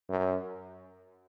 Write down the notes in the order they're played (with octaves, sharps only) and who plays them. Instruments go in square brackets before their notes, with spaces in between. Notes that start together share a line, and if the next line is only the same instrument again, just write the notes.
[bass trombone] F#2